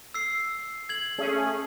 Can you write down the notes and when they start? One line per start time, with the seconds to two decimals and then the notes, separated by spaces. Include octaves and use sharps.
0.14 E6 C7
0.89 G#6 F#7
1.18 A3 C#4 G#4